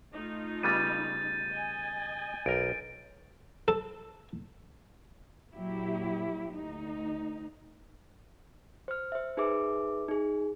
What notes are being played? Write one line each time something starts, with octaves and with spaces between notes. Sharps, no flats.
A3 D#4 F4
C#3 G3 B3 G6 A6 D#7
D#5 G#5
B1 A#4 D7
A4
A#2 F#3 E4 G4
D2 D#4
C5 F6
C5 E5
D#4 G#4 B4 E5 D6
D#4 G#4